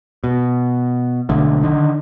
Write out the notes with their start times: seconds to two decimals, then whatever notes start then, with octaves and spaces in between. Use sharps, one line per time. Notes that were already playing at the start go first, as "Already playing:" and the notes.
0.24 B2
1.29 B1 D3 A3
1.63 D3 D#3